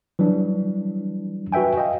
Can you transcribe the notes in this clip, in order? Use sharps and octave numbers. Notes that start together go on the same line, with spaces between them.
E3 F#3 G3 D4
F#4 B4 E5 G5 G#5
D#5 F5 G5